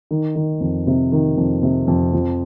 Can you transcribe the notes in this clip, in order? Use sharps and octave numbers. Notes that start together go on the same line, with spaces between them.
D#3
D#3
F2
C3
D#3
F2
C3
F2
F3